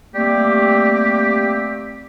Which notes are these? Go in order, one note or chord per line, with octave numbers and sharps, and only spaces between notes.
G3 A3 A#3 C4 G4